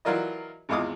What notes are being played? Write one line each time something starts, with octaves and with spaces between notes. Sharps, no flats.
E3 F#3 F4 A#4 D5 D#5
G#1 E2 G#3 F4 D6 D#6